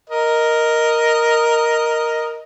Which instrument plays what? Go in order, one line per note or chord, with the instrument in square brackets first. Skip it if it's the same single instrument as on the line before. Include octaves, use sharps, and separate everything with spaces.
[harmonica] A#4 D#5